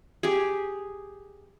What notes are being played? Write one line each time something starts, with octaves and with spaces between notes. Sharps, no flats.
G4 G#4